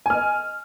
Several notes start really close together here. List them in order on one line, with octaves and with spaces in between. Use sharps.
G#5 F6 D#5